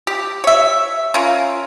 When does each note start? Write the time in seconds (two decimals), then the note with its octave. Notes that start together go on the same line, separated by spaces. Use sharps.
0.07 G4
0.44 C#5 E5
1.14 C#4 F4 A#4